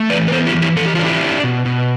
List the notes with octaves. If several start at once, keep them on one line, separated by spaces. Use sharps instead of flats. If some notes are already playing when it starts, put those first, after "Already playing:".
Already playing: A3
E3 B4 D5
B4
B3 A4 C5
E4 G4
E3
E4 G4
E3 A4
G4
F4
D4
E4 G4
D4
B2
B2